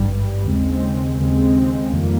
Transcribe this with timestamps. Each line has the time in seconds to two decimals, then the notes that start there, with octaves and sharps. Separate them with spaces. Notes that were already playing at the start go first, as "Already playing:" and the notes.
Already playing: G#1 G2 G3
0.44 D#2 C#3 G#3 C4
1.18 D#2 C#3 G#3 C4
1.92 F2 D#3 G3 A#3